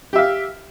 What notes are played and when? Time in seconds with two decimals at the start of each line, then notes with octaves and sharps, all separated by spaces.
0.13 G4
0.15 E5
0.18 F5